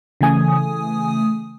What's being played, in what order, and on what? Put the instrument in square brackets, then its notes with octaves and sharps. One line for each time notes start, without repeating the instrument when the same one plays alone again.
[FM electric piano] C#3 E3 A3 G#5 D#6